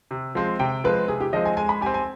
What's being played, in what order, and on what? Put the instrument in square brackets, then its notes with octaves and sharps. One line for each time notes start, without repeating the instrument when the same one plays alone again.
[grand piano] C3
F3 G#3 C4
[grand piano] C3 [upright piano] G5
[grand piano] F3 G#3 C4 [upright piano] B4
[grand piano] C3 [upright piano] G#4
[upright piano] G4
[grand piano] F3 G#3 C4 [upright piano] D#5
[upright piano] G#5
[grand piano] G#3 [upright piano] G#5
[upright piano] B5
[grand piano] G4 [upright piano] G#5
[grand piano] C4
[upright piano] G#5